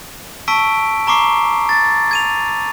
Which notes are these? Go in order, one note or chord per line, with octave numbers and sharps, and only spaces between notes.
A5 C#6 E6 B6 D7
A#5 C#6 D6 C7
A6
G#6 D#7 F7